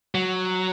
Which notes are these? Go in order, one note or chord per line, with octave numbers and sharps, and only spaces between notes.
F#3